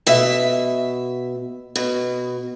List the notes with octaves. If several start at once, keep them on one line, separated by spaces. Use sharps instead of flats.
B2 E5
B2